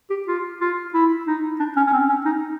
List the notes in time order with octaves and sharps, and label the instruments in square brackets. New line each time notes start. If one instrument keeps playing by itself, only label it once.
[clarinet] G4
F4
F4
E4
D#4
D4
C#4
C#4
C4
C#4
D#4